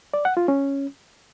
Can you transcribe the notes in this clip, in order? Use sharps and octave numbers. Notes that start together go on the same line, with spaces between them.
D5
F#5
F4
C#4